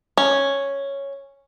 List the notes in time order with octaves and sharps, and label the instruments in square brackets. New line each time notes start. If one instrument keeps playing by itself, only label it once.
[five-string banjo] C#4